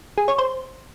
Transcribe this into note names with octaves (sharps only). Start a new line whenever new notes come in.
G#4
C#5
C5